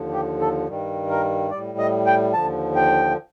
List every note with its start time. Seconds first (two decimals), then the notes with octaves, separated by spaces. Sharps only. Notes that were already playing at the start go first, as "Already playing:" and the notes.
Already playing: D#2 D3 F3
0.13 G4
0.41 A4
0.68 G2 D#3 G3
1.10 A#4
1.51 A2 G3 D5
1.79 D#5
2.07 G5
2.34 D#2 D3 F3 A5
2.76 G5